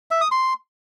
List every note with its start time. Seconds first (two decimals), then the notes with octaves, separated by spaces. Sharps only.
0.11 E5
0.21 D#6
0.32 C6